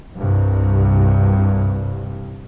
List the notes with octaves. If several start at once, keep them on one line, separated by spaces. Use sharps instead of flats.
C2 G2